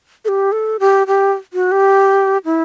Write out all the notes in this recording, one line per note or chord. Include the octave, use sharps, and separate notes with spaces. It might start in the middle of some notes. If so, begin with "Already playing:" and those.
A4
G4
A4
G4
G4
F#4
G4
E4